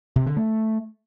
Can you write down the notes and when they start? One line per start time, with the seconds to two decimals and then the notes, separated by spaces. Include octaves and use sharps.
0.16 C3
0.26 D3
0.37 A3